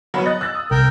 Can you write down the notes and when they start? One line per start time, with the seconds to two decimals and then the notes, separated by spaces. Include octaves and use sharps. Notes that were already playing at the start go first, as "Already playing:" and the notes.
0.14 F#3 B3 A#4 F#5 B5
0.26 D#5 F#6 A6
0.41 E6 F#6 A6
0.55 D#6
0.71 C2 A#4 G5 E6